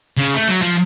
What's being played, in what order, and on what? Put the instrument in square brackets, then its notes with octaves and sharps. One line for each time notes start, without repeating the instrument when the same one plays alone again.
[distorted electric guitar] C#3
A3
F#3
F3